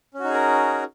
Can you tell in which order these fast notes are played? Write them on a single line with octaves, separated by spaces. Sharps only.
C#4 F#4 D#4 G#4 A#4